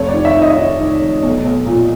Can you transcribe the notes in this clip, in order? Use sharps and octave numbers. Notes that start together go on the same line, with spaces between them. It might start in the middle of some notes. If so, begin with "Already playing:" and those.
Already playing: F1 C#5
D#3 D5
E5
D#3
D#5
E5
D#3 D#5
D#3
F1
B1
B1
A#2